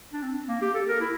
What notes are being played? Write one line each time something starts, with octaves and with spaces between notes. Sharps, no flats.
D4
C4
A#3
G4
A4
A#4
E4